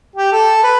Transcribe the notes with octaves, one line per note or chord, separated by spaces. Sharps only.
G4
A4
B4